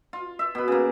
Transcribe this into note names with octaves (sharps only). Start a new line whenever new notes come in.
F4
E5
B2 B4
C#3 A#3